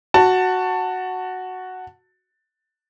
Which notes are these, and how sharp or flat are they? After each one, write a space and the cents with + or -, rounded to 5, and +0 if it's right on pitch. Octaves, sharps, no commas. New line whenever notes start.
F#4 +0 A5 +15